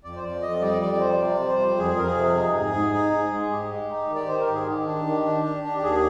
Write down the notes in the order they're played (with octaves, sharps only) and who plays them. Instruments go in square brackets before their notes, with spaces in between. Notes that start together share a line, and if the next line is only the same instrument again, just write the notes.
[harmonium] F2 D5
C5
F2 D5
F2 D#5
G3 D5
F2 D5
G3 C5
C3 D5
G3
C5
F2
F2 G#4
F2 A#4
G#4
C3
D#4
G#2
G#2
D#4
G#2
G#3
G#2 G4
G#3
D#4
D#3
D5
D#3 C5
A#4
G#2
G#4
D#3 G4
D4
D#3
D4
D4
D4
G4
D#2 G#4